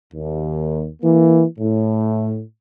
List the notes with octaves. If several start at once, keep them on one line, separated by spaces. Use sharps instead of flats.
D#2
E3 A#3
A2